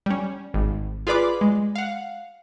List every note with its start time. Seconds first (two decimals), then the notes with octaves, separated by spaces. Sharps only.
0.06 G3 C#4
0.54 G#1
1.07 F4 G#4 B4 D5 B5 D6
1.41 G#3
1.75 F5 F#5